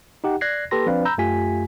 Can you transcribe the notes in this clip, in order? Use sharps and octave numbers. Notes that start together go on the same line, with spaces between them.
D#4 G4 F#5
D5 F#6 G#6 A#6 C7
A#3 G4 A4 B4 C6 A#6
F3 C4 D4 B4 D5 F5
A#5 B5 E6 G6
F#2 A3 F4 G4 G#5 B6